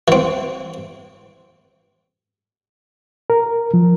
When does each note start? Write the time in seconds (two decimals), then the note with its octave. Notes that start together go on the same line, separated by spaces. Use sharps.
0.08 E3 C4
3.30 A#4
3.74 F3